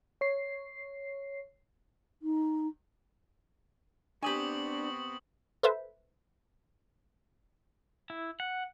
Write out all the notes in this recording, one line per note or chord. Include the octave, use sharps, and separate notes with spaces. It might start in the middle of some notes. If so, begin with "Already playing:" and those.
C#5 C7
D#4
B3 C4 D4 G4 G#5 C#6 D#6 F#7
A4 B4 C5 E5
E4
F#5